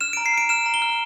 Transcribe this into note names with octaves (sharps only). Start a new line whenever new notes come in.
F6 E7
A#5 D7
C7
F6 D7
F6 E7
A#5
G7
F6